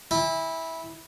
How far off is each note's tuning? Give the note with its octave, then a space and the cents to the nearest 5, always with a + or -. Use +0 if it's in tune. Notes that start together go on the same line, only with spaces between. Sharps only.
E4 -15 G#5 -45